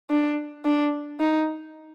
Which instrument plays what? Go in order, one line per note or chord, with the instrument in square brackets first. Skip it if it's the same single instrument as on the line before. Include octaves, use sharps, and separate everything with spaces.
[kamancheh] D4
D4
D#4